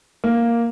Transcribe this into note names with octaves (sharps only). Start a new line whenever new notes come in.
A#3